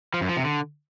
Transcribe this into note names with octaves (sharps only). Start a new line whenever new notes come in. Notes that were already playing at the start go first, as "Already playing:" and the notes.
F3
F#2
F3
C3
D3